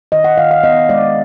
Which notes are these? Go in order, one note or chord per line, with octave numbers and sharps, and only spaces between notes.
D#3 D#5
F#5
D#3 F5
F5
B3 D#5
G#3 D5